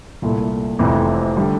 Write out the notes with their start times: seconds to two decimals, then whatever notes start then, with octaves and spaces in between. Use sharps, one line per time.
0.22 C2 A#2 A3 E4
0.79 F1 F2 C3 E3
1.37 D3 G3